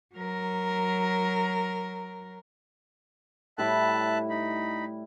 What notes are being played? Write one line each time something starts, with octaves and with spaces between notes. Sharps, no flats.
F#3 A#4
A2 G3 E4 E5 A5 F#6
D#4 B5